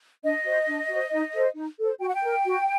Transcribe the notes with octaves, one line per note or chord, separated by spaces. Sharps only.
D4 D#5
F#4 C5
D4
F#4 C5
D#4
A4 C5
D#4
A4 C5
F#4 G5
F#5
G5
A#4
F#4